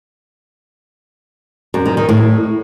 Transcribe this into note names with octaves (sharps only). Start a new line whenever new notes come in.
F#2
D#3
D#3
A2